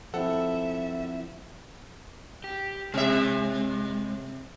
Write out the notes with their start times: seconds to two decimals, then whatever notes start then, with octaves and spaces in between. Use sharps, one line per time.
0.14 F3 C4 E4 A4 E5 F#5
2.44 G4
2.94 C3 G#3 E5